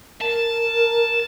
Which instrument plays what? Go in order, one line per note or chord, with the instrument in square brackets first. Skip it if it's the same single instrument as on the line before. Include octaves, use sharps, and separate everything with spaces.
[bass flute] A#4 [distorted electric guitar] A5